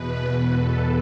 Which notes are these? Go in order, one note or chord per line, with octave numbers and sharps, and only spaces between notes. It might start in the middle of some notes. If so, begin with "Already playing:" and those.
Already playing: E2 B2 B4
A4